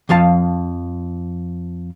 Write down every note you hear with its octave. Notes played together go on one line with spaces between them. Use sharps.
F2 F3 F5 A5